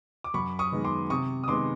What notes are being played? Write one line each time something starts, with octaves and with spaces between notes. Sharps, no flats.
D6
F#2 B5 C#6
C#6 D#6
D#3 G#3 B3
C6 D6
C3 C#6 D#6
D#6
D#3 G#3 B3 C6 D6